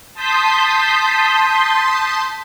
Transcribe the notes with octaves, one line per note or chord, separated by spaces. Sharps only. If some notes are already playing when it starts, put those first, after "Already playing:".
A5 C6 D#6 G6 B6